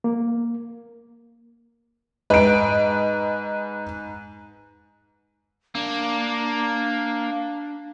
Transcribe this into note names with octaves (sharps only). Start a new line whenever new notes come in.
A#3
G#2 B4 D#5 D7
A#3 D4